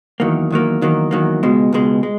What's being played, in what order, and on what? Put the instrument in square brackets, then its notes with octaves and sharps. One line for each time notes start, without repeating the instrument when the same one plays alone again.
[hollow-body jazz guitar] E2 D#3 F#3 A#3
E2 D#3 F#3 A#3
E2 D#3 F#3 A#3
E2 D#3 F#3 A#3
C#2 B2 G#3
C#2 B2 G#3
G#3